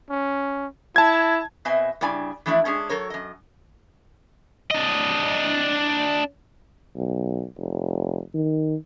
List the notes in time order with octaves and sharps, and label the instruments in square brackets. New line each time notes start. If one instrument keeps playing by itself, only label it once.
[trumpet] C#4
[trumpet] E4 [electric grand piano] A5 G#6
[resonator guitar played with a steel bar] B2 C4 B4 D#5 E5 G#5
G2 C#3 E4 D5 G#5
E3 F3 A3 D4 E4
G#3 C#4 D4 G#4
F#3 A4 A#4 C#5
F#2 D#5
[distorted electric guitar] D4 D#5
[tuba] B1
F1
D#3